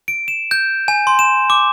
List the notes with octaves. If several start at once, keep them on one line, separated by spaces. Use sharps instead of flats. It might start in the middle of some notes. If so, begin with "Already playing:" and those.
D7
E7
G6
G#5
C6
E7
D6